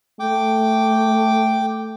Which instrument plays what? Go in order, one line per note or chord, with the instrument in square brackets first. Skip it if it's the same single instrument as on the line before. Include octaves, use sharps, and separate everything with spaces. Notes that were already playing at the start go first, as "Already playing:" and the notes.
[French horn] A3 [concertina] G5 D6